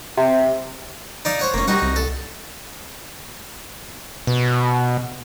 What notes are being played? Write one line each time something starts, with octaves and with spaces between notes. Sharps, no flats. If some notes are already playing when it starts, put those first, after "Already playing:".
C3
D#4 D5 F5
C5 C#5 F#5
F1 A#3 C#4
G3 D#4 F#4 F#5
C2
A4
B2